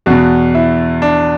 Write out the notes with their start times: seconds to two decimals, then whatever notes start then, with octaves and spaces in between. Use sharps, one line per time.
0.06 E2 B2 F#4
0.55 E4
1.02 D4